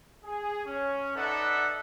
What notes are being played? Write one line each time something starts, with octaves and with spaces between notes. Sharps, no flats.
G#4
C#4
D#4 A4 B4 D5 E5 F#5